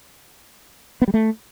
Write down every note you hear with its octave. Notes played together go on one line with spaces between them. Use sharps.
B3
G3
A3